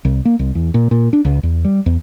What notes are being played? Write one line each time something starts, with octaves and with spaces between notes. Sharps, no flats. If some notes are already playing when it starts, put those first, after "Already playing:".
C2
A#3
C2
E2
A#2
A#2
D4
C#2
E2
G3
E2